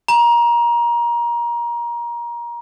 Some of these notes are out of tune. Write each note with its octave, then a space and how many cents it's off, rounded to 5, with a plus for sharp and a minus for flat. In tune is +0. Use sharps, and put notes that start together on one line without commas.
A#5 +25